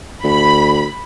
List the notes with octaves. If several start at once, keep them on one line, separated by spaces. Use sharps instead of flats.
D2 B5